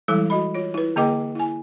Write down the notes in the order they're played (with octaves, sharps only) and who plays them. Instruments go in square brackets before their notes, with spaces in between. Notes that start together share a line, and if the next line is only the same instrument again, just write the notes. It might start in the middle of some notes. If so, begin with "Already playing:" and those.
[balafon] E3 G3 G#3 E4 A4
F#4 D#5 B5
F4 C#5
E4 B4
D3 A#3 G#4 D#5 G5 D6
E4 G#5